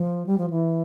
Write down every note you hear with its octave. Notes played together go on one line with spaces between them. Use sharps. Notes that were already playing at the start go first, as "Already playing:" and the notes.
Already playing: F3
G3
F3
E3